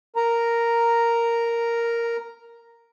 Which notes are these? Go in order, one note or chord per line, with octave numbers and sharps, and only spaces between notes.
A#4 A#5